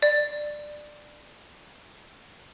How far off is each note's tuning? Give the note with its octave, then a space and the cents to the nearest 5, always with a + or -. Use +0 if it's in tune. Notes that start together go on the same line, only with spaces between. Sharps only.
D5 +15